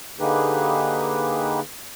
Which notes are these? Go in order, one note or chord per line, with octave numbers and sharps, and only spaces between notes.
D3 A#3 D#4 G4 G#4 B4